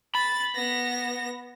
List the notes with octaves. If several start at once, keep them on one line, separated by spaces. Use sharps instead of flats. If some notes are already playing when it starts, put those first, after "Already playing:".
B5 A6
B3 A#6